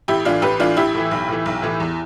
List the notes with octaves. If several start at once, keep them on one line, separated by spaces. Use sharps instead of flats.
A1 E4 G4
A2 E3 D4 F4
A1 G4 B4
A2 E3 D4 F4
A1 E4 G4
A2 E3
B1
A2 E3
B1
A2 E3
E2